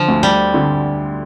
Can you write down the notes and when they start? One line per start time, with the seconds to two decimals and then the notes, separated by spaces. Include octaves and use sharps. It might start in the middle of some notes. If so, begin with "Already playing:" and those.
Already playing: D3 F3
0.08 D2
0.23 G3
0.54 D3